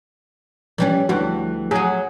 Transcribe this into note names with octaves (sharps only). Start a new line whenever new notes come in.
E3 F3 G3 C#4
D2 E3 G3 F#4
F#3 F#4 G#4